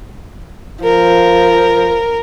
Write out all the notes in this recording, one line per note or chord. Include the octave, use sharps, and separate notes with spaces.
F3 A#4